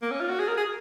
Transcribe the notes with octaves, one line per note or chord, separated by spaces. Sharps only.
A#3
C#4
F4
F#4
G#4
A#4
G#4